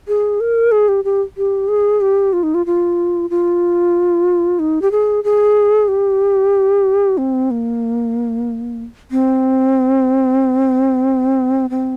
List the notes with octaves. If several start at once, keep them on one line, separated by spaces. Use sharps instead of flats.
G#4
A#4
G#4
G4
G4
G4
G#4
G4
F4
D#4
F4
F4
F4
D#4
G4
G#4
G#4
G4
C4
A#3
C4
C4